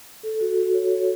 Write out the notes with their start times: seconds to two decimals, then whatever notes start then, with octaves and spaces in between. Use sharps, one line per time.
0.23 A4
0.41 F#4
0.58 F#4
0.74 C#5
0.92 C#5